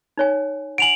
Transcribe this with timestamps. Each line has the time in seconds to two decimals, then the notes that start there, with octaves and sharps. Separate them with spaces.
0.17 D#4 C#5 G#5
0.78 F#5 G#5 D7 F7 F#7